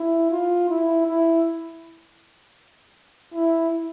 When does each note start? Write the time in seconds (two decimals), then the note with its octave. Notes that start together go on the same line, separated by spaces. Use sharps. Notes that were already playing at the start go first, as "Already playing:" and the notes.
Already playing: E4
0.31 F4
0.69 E4
1.07 E4
3.34 E4